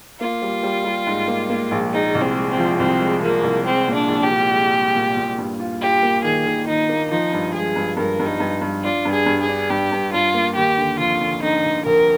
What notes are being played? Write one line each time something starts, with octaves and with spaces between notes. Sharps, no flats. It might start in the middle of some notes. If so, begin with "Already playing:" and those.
A#3 F4
G3
G3
G3
G#2
A#3
A#3
A#1
G#3 D#4
C2
C4
G#3
C4
F3
C2 C4
G#3
F3 A#3
C2
G#3 C4
A#2
D4
A#1
G4
A#2
G#3
G#3
A#2
A#2
G2
F4
F4 G4
A#3
D#3 G#4
D#3
D#3 D#4
A#3
F3 D#4
G2
G#3 G#4
G2
G2 A#4
G2
D#4
G2
G2
D4 F4
G2
G#4
G2
G#4
D4
G2 G4
G2
G2 F4
A#3
D#2 G4
D3
F1 F4
D3
D3 D#4
F1
F1 A#4